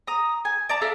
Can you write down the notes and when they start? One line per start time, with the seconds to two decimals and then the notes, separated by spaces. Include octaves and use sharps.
0.07 A#5 D#6
0.45 G#5
0.69 D5 A5 A#5
0.81 A4 E5 F5 A#5